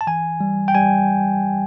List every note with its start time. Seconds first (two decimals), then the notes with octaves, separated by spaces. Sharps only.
0.01 A5
0.07 E3 G#5
0.41 G3
0.68 G5
0.75 G3 G#5